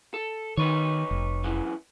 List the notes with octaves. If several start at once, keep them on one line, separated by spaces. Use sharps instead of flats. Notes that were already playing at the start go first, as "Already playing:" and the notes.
A4
D#3 D#4 B4 C#5
F1
F#2 E3